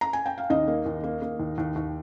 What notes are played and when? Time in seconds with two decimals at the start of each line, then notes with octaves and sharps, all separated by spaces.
0.01 A#5
0.13 G#5
0.26 G5
0.38 F5
0.50 D#2 D#4 D#5
0.68 A#3
0.86 D#2
1.04 A#3
1.22 A#3
1.40 D#2
1.58 D#2
1.76 D#2